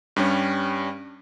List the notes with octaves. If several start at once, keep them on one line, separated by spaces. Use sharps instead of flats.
G2 G3 C#4